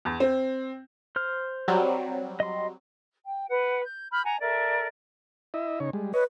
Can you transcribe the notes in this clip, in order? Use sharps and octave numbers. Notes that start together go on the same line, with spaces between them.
E2
C4
C5 F6
F#3 G3 C4
D#5 C6
G5
B4 F#5
G6
B5 F6 G6
F#5 G#5 A#5
A4 A#4 D5 E5
E4 D#5 E5
C#3 D#4 C#5
G3 G#3
B4 C#5 D#5